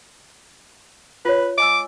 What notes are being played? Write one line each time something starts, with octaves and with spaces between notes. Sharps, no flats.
F4 B4 C#5
D#5 G#5 D6 E6